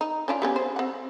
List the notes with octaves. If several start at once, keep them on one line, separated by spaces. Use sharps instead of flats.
D#4
C#4 D4 F4
G3 B3 C#4
C5
C4 F#5